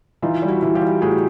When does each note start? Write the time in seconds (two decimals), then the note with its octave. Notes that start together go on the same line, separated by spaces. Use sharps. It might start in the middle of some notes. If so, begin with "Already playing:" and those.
0.22 E3 D#4 F4
0.42 G3
0.48 E4 F#4
0.62 E3
0.75 F4 G4
0.81 G3
1.01 A2 F#4 G#4